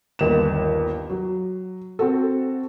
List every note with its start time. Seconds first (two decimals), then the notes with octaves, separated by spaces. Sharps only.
0.19 G1 D#2 E7
1.10 F#3
1.99 C4 F#4 A4